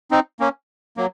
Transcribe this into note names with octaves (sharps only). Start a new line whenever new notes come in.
C4 D#4
A#3 C#4
F#3 A#3